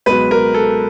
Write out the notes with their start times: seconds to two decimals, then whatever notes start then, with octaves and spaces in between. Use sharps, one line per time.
0.06 C#2 B2 F#3 B4
0.31 A#4
0.54 A4